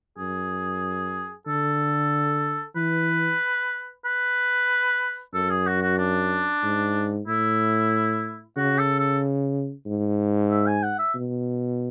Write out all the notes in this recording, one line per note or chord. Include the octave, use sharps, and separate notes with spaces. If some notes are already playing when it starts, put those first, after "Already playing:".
F#2 G#4
D3 A4
E3 B4
B4
F#2 A4
G#4
F#4
F#4
D4
G#2
A2 E4
C#3 F#4
A4
A4
G#2
E5
G#5
F#5
E5
B2